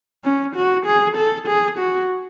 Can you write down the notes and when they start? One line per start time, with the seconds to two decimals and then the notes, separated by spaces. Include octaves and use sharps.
0.24 C#4
0.56 F#4
0.86 G#4
1.16 A4
1.47 G#4
1.79 F#4